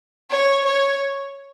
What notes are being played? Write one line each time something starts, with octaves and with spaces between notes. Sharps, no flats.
C#5
C#5